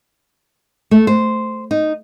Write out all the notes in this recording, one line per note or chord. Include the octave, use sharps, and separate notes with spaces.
A3
C5
D#4